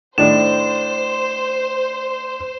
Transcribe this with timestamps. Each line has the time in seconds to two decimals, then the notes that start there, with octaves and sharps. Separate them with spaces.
0.18 A2 D#3 D4 C5 E7